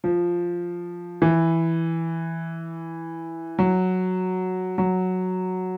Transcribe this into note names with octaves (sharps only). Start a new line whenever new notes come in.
F3
E3
F#3
F#3